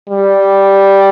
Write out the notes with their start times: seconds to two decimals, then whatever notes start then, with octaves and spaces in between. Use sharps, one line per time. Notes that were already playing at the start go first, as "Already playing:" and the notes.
0.08 G3